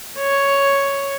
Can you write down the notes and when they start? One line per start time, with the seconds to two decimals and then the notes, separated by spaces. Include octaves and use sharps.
0.18 C#5